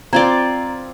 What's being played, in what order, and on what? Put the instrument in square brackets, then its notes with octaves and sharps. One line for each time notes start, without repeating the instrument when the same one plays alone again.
[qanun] C4 F4 D5 [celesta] A#5 G#6